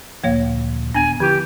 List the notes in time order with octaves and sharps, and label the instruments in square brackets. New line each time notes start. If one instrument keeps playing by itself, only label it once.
[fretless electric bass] D2 A#2 F3 [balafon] A#3 C#5 F5
[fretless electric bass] D#1 [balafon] B3 D4 [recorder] G#5
[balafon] D3 E4 [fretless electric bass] F3 [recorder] G4